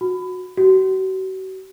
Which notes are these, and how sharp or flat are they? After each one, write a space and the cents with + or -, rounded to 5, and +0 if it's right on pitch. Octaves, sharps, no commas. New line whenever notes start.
F#4 -15
F#4 +40